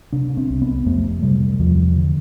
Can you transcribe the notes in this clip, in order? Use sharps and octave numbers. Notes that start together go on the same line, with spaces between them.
C3 D4
C4
C2
B3
F2 A3
C3 G3
E2 F3
D3